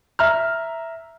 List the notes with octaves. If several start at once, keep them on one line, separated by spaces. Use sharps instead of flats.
E5 A#5 F6